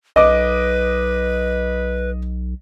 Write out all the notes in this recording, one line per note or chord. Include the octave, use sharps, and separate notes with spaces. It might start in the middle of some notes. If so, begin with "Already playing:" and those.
B1 B4 D#5 D6